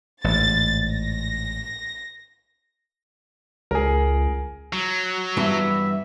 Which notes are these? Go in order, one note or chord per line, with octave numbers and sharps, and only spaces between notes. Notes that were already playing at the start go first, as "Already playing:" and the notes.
A1 G#2 A6
A#6
C#2 G#4 A#4
F#3
G2 E3 B3 E5